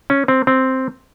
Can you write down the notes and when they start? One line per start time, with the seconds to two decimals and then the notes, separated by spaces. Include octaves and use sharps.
0.10 C#4
0.28 C4
0.47 C4